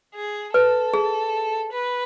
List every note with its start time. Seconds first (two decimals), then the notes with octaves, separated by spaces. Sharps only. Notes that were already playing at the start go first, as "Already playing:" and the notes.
0.15 G#4
0.53 A4 B4
0.94 G#4
1.73 B4